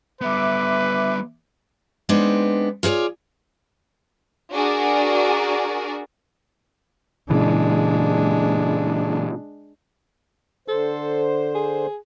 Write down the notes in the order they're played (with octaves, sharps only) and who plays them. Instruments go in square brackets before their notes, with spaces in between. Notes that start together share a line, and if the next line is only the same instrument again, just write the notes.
[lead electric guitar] G3 B3 [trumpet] B4 [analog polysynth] E5 D6
[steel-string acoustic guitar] G#3 B3 C4 D4 D#4
F4 G#4 B4 C#5 D5
[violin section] D4 F#4 G#4 A#4 D5
[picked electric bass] A#2 C#3 E3 [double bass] G#3 D4
[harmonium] D3 C5 [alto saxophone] A4
[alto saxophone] G#4